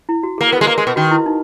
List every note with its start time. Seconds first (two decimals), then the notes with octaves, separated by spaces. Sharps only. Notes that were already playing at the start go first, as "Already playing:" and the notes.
0.09 E4
0.23 F#4
0.38 G#4
0.41 A#3
0.48 A#4
0.52 B3
0.57 G#4
0.61 G#3
0.67 A#3 A#4
0.78 G#3
0.87 B2
0.96 D#3 F#4
1.11 E4
1.26 D#4